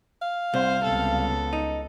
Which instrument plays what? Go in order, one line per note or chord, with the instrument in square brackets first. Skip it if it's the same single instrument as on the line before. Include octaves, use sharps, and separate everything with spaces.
[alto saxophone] F5
[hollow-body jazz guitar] C2 [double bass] C4 [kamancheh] C5
[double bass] C#2 B3 [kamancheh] A4
[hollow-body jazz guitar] D#4